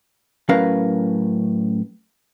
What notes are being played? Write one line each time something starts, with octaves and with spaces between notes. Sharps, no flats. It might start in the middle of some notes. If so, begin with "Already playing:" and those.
A2 F#3 C#4 A#4 B4 F5